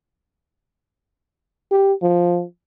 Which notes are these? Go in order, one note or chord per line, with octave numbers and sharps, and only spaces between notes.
G4
F3